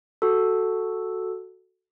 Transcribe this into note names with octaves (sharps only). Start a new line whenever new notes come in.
F#4 A4